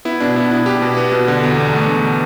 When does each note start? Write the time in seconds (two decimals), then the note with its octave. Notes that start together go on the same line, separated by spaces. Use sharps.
0.05 B3 E4
0.20 B2 D4
0.36 B3 E4
0.51 B2 E4
0.66 B3 G4
0.82 B2
0.97 B3
1.12 B2
1.28 D3
1.43 E2
1.59 E2
1.74 A3
1.88 D3